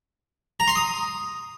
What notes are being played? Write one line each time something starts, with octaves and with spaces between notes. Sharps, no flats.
A#5
C6
D#6